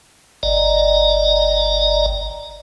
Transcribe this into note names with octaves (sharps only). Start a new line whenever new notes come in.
G1 D5 D#5 A#5